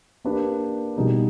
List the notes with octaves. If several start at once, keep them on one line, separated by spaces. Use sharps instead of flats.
A#3 D4 G4 B4 D5
B2 G3 B3 D#4 G#4